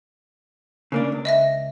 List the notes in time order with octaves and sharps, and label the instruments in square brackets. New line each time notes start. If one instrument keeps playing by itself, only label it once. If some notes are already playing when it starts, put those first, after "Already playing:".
[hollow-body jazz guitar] C#3 A#3 D4
C#2
[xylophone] D#5 E5 A#6